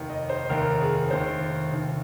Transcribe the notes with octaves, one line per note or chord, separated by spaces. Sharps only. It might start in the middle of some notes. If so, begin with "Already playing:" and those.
Already playing: F1 D#2 D#3
D#5
C5
F1 D#2 D#3 A#4
G#4
F1 D#2 D#3 C5
F1 D#2 D#3